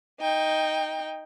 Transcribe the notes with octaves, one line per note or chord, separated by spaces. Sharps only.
D#4 G5